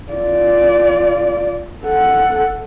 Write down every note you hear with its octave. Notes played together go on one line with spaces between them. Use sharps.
F4 D5
A4 F#5